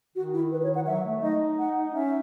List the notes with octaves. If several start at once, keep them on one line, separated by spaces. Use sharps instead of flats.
D#3 F#4
E4
B4
C#5
F#5
F#3 E5
A3
D#4 D#5
F#5
C#4 E5